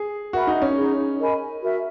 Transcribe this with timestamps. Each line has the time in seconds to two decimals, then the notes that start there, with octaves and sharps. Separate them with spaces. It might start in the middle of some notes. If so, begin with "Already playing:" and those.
Already playing: G#4
0.33 F#4 A#4 E5 B5
0.47 D#4
0.62 C#4
0.76 D#4 G#4 C#5
1.19 A#4 D#5 G#5 B5
1.61 F#4 A#4 E5